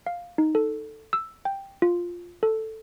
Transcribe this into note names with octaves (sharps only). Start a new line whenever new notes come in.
F5
D#4
A4
E6
G5
F4
A4